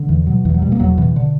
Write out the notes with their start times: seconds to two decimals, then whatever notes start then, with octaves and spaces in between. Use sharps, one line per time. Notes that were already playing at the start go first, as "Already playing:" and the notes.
Already playing: D3
0.09 E2 E3
0.27 B2 F#3
0.45 E2 E3
0.54 F#3
0.62 B2 G3
0.72 A#3
0.80 E2 F#3
0.98 B2 E3
1.16 D3